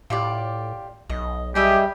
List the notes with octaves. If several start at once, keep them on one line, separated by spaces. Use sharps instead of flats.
A2 F4 G4 D5
B1 D#5
G3 G4 G#4 D#5 E5